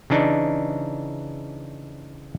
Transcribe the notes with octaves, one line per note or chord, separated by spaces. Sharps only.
C#3 E3 D4 D#4